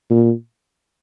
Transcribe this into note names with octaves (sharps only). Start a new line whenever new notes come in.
A#2